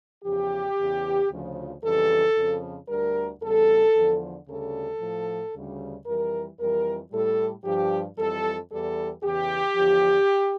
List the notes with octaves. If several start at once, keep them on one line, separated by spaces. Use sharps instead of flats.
E2 C#3 F3 G4
E2 C#3 E3
D2 C#3 F3
F2 C#3 E3 G3 A4
F2 C#3 F3
D2 D3 G3 A#4
E2 C#3 G3 A4
E2 D3 F3
D2 C#3 G3 A4
A2 F3
D2 C#3 G3
F2 E3 G3 A#4
F2 E3 G3 A#4
A2 G3 A4
G2 F3 G4
F2 E3 G3 A4
E2 E3 G3 A4
E2 C#3 E3 G4
E2 D3 F3